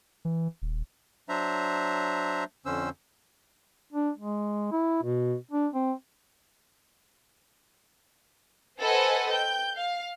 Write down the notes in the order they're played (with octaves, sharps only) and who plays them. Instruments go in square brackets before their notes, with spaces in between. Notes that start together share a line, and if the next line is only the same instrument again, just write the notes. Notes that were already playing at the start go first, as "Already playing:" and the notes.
[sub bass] E3
D#1
[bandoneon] F#3 D4 C5 E5 A#5
F2 D3 C#4 C5 E6
[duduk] D4
G#3
E4
B2
D4
C4
[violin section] A4 B4 C5 D#5 F#5 G#5
G5 G6
F5